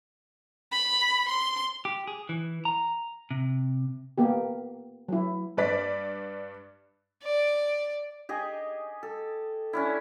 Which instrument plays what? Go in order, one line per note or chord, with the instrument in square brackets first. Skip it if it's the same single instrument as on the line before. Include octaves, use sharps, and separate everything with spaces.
[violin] B5
C6
[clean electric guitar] G4
G#4
E3
A#5
C3
[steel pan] A#3 B3 G4
F#3 E4
[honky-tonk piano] G2 B4 D5 B6
[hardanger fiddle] D5
[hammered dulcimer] G4 G#4 D#5 G#5
A4
C#4 D4 E4